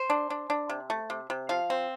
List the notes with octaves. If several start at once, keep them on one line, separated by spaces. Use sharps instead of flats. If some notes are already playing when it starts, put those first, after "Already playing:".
Already playing: C5
D4
D4
D4
C3
A3
C3
C3
F3 F5
C4